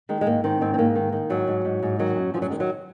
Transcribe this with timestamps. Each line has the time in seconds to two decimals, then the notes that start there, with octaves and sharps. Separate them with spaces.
0.09 D#3 G#3
0.21 G#3
0.26 G#2 A#3
0.44 D#3 C4
0.61 G#2 C4
0.74 C4
0.78 G#2 A#3
0.95 D#3
1.12 D#3
1.30 G#2 F#3
1.48 G#2
1.65 G#2
1.83 G#2
1.99 D#3 F#3
2.16 F#2
2.34 F#2 F3
2.42 F#3
2.50 D#3 G#3
2.60 F#3